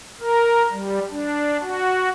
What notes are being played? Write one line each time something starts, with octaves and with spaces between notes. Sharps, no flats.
A#4
G3
D4
F#4